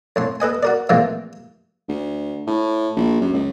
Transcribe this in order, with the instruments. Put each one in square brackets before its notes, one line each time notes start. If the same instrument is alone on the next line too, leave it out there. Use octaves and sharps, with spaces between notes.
[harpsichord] F2 A2 C6
A4 B4 D#5 G#5
F#4 A#4 D5
A#2 E3 F3 G#3 A3 C4
[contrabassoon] D2
A2
A#1
F#2
C#2